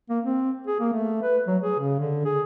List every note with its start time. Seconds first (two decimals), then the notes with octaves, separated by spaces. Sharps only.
0.10 A#3
0.24 C4
0.67 G#4
0.80 A#3
0.93 A3
1.23 B4
1.47 F#3
1.62 G#4
1.79 C#3
1.99 D3
2.25 G#4